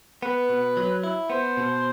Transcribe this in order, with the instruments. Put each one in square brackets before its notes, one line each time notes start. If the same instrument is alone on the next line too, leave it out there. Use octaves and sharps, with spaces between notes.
[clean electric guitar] B3 [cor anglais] B4
[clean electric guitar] B2
F#3
E4
[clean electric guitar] B3 [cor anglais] C5
[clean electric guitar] B2